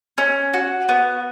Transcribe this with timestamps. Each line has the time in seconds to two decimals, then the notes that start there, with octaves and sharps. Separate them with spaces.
0.18 C#4
0.54 F#4
0.89 B3